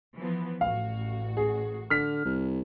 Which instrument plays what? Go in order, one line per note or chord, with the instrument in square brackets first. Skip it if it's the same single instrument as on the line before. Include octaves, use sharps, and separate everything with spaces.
[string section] E3 F3 B3
[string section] A1 F#4 [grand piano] F5
[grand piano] G#4
[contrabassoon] D3 [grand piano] F6 B6
[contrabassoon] C2